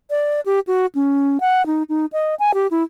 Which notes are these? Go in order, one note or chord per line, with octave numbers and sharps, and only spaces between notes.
D5
G4
F#4
C#4
F#5
D#4
D#4
D#5
G#5
G4
E4